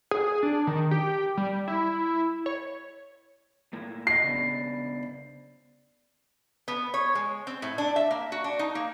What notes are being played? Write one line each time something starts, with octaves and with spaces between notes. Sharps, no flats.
G#4
D4
D#3
G4
G3
E4
C#5
A2 A#3 E4
F#4 D#5 C7
C#3 B3 D4
B3
C#5
G#3
C4
A2
D4
E5
A#3
F#4
D4
D#4
A#3